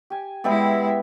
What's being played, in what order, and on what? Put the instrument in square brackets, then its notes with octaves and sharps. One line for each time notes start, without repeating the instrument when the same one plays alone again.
[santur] G4 G#5
[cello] G#3 E4 [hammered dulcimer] B3 E5 B5 [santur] G4 D5